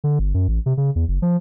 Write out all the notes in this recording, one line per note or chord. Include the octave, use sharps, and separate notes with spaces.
D3
G1
F#2
A1
C3
C#3
E2
F#1
F3